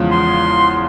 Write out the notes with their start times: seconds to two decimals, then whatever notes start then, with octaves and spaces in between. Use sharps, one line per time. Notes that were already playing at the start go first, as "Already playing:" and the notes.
Already playing: E2 C#3 F3 G#3
0.11 C6